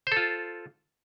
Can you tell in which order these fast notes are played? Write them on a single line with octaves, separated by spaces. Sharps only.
C5 A4 F4